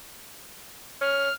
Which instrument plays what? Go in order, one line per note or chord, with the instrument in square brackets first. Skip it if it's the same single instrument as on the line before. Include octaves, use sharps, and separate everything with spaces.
[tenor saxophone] C#4 [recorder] F6